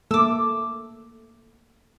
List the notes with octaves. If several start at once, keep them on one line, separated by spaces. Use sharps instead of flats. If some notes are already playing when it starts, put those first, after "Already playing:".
A3 A#3 A4 D6 E6